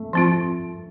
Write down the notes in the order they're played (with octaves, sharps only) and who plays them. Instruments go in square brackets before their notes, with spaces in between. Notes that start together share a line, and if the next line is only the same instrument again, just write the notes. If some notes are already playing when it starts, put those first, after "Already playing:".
Already playing: [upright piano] A3
[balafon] F3 C4 F4